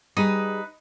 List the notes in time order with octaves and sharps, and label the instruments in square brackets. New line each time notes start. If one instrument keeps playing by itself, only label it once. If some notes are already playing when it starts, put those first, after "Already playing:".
[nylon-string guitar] G3 G4 G#4 [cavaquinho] D#4 B4 D#6